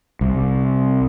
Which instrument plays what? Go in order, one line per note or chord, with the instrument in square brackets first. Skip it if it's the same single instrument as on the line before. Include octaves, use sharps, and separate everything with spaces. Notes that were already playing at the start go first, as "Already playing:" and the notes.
[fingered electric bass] C2